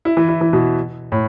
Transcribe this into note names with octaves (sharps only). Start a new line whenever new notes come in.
E4
E3
E4
E3
B2
A2